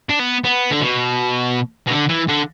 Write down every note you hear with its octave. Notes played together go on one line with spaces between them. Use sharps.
D4
B3
B3
D3
B2
B2
D3
E3
D3